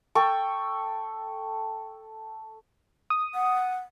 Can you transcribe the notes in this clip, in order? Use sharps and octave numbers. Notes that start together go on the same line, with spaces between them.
A4 G5 C#6
D#6
F#5